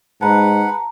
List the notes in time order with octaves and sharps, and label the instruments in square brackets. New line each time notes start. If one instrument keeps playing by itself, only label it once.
[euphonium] G#2 [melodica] B4 F#5 [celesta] A5 A#5